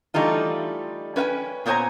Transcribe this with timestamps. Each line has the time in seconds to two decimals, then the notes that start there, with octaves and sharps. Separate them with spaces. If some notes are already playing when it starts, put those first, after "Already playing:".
0.14 E3 G3 A3 D#4 F4
1.16 C#4 B4 F5 G5 G#5
1.66 A#2 B3 C5 C#5 G#5 A#5